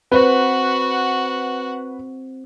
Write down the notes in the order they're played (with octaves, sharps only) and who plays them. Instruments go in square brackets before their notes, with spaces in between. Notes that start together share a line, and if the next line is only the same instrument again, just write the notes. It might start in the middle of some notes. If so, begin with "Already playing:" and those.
[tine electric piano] C4 C5 [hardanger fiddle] F#4 F#5 [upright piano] B4